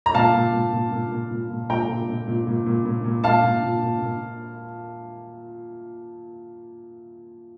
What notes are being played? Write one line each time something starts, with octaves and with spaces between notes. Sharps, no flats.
A#5
A#2 F5 A5
A#2
A#2
A#2
A#2
A#2
A#2
A#2
A#2 G5 A#5
A#2
A#2
A#2
A#2
A#2
A#2
A#2
A#2 F5 A5
A#2
A#2
A#2
A#2